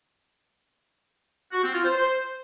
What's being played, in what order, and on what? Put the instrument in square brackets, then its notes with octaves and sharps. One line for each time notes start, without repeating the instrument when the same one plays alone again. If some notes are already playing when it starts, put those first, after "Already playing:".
[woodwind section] F#4
C4
F4
C5
C5